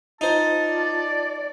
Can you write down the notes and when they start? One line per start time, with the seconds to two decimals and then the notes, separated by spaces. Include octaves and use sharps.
0.21 D#4 F4 C5 A5
0.69 D5